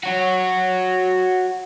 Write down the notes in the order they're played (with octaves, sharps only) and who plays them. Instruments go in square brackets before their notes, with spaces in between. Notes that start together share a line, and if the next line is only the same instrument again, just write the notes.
[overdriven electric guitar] F#4 C#5